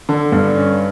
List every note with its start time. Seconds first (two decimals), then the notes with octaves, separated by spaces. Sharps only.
0.09 D3
0.32 G2
0.55 C#4